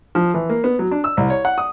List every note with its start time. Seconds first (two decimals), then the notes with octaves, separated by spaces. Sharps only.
0.15 F3
0.34 E3
0.49 A#3
0.64 B3
0.79 F#3
0.91 D4
1.04 E6
1.17 C2
1.30 C#5
1.45 F#5
1.58 D#6